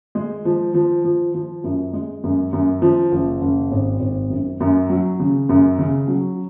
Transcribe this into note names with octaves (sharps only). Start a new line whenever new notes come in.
G#3
F3
F3
F3
F3
F#2
G#3
F#2
F#2
F3
F#1
F#1
G#1
G#1
F#2
F#2
F#3
C#3
F#2
C#3
F#3